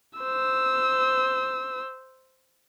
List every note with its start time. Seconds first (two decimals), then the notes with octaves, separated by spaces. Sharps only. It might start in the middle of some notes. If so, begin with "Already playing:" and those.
0.19 C5 E6